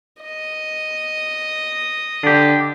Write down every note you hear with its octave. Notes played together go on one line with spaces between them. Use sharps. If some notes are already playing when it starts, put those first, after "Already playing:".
D#5
D3 D4 G4